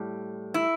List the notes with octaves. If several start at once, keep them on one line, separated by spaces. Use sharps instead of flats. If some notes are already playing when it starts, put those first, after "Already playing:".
Already playing: A2 G3
E4